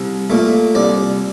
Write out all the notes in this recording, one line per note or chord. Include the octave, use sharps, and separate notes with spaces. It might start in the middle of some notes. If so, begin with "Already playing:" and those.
Already playing: C2
A#2 A3
C2 D5